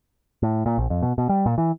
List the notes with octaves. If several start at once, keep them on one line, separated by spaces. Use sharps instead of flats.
A2
A#2
A#1
F2
B2
B2
G3
A#2
E3